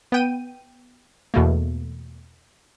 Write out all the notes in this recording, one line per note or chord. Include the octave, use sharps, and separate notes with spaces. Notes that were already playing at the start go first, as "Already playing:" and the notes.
B3 G5 D#7
E2 B2 A3 A#3